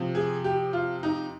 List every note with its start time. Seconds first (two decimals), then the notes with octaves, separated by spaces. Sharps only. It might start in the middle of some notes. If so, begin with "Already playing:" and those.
Already playing: C3 F3
0.15 G#4
0.44 G4
0.73 F4
1.03 D#4